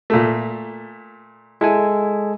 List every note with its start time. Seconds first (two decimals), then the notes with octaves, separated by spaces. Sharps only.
0.10 A#2 A3
1.61 G#3 E4 A4 G#5